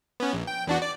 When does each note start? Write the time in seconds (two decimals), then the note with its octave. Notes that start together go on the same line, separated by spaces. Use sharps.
0.20 B3 C#4
0.33 A#1
0.47 G5
0.67 E2 D4 F#4
0.82 D5